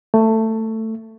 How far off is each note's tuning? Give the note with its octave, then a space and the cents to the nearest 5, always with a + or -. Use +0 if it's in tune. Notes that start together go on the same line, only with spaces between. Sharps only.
A3 +15